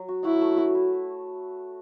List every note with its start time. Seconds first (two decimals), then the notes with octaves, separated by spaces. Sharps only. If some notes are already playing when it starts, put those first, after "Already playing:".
Already playing: F#3
0.08 F#4
0.25 E4 F#4
0.41 A3
0.58 F#4
0.75 E4